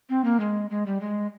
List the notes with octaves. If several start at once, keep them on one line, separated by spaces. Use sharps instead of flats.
C4
A#3
G#3
G#3
G3
G#3